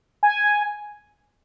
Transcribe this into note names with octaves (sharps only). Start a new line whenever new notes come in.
G#5